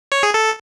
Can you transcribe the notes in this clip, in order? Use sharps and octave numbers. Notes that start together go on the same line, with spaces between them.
C#5
G#4
A4